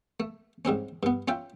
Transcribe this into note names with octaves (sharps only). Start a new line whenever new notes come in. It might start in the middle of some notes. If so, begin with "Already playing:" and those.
A3
G#2 G3 C4 C#4
G2 B3
C#4 F4 E5 G5